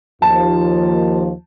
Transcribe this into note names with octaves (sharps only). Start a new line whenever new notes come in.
D#2 F3 A5